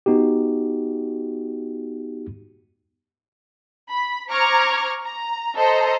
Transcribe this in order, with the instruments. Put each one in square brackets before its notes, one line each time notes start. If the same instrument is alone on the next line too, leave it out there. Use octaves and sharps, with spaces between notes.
[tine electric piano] B3 D#4 F#4 G4
[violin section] B5
C5 A#5 C#6 D6 F6 G#6
A#5
A4 C5 D#5 A#5